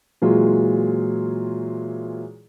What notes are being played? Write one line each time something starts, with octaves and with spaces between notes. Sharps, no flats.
A#2 E3 F#3 G#3 F4 G#4